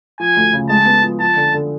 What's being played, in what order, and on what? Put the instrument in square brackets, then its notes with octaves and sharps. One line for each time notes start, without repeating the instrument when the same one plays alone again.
[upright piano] F3 [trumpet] G#5
[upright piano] D2
C#3
[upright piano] G#3 [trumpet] A5
[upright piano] B3
F3
[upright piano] F3 [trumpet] A5
[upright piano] D3
D3